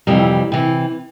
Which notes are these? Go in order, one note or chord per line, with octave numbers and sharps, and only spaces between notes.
F2 C3 E3 G3
C3 E3